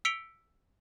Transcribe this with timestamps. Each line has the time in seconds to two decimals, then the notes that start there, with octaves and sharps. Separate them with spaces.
0.05 E6 B6 C#7 D7 F7 G7